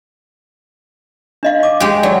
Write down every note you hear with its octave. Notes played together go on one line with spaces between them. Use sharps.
D4 D#5 F5
D6
G#3 G4
F#3 D5